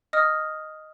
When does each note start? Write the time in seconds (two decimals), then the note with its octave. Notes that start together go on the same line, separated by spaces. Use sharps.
0.13 D#5 D#6 F6